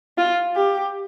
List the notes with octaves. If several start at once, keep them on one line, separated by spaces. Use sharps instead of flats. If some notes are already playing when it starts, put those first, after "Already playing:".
F4
G4